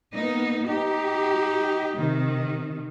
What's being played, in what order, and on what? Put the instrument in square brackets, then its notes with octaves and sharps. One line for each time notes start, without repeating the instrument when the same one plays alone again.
[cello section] A#3 B3 D#4
[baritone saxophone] D#4 [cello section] G4
[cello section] C3 D#3